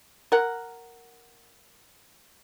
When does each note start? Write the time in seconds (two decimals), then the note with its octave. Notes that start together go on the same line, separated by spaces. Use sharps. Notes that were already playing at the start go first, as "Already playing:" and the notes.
0.32 A#4 F#5